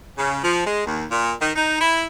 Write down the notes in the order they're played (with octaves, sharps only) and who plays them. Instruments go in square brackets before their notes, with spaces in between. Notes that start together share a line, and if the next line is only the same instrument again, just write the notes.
[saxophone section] C#3
F3
G#3
D#2
A#2
D#3
D#4
E4